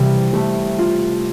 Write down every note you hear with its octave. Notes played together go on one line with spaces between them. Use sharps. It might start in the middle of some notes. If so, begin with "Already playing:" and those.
Already playing: C3 E3 G3
G3 A3
F4